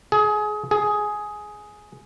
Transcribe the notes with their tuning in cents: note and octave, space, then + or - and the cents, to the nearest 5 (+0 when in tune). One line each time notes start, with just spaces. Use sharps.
G#4 +25
G#4 +10